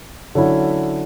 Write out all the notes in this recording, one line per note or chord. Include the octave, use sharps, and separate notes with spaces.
D3 F#3 C#4 E4